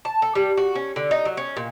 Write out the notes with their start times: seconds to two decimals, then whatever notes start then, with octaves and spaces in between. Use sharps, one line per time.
0.05 A5
0.22 A4
0.35 G3
0.57 F#4
0.75 C#4
0.96 D3
1.11 D#4
1.25 F#3
1.37 C#4
1.57 A#2